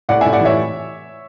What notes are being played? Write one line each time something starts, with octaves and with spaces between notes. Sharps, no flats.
A2 D5 F#5
A2 E5 G#5
D5 F#5
E3 C#5 E5